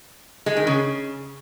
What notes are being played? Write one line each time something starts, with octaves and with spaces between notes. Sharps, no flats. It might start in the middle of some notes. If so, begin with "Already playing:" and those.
G#3
D#3
C#3